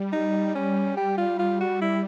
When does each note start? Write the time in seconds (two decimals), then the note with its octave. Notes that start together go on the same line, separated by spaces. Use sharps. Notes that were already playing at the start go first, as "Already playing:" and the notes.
Already playing: G3
0.13 D#4
0.55 C#4
0.97 G3 G4
1.18 F4
1.39 F4
1.61 F#4
1.82 E4